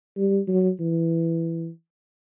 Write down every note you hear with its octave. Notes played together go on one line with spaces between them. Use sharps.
G3
F#3
E3